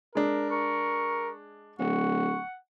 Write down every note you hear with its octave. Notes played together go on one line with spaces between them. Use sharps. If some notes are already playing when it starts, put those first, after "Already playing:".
G#3 D4 A#4
A#4 C#6
D1 F#5 C#6